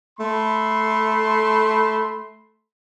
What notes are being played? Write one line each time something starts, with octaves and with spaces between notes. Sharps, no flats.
A3 B5 C6